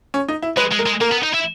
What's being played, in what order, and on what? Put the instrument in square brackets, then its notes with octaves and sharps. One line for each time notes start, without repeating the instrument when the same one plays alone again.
[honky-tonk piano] C#4
D#4
E4
[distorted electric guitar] G#3 [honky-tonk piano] B4
[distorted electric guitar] G#3
[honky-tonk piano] A#4
[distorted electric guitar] G#3
[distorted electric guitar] A#3 [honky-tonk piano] A#4
[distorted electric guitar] B3
D#4
E4